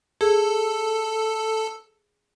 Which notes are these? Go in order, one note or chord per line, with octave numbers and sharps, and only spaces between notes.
G#4 A4